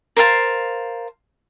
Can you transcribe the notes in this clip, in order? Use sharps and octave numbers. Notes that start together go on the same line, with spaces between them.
A#4 C5 F5 A5